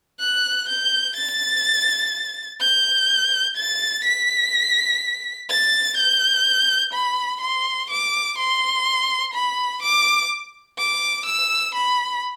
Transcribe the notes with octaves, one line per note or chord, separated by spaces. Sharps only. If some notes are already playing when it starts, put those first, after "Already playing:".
F#6
G6
A6
G6
A6
B6
A6
G6
B5
C6
D6
C6
B5
D6
D6
E6
B5